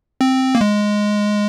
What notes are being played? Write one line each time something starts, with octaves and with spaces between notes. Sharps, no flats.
C4
A#3
G#3